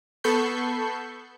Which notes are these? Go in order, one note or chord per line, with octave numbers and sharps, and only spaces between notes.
B3 A4 B5 C#6 G6 C7